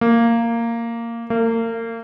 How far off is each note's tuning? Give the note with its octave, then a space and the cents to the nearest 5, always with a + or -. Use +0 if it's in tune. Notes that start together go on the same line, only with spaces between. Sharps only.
A#3 -10
A#3 -35